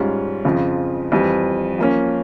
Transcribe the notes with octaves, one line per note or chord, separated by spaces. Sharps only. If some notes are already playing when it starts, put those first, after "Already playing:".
Already playing: G#2 G3 C#4 F4
F2 C#3 F3
F2 E3 G3
F3 A#3 C#4